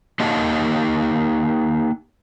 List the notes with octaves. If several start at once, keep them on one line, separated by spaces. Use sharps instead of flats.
A#3 D#4 G4 D#5 F#5 A5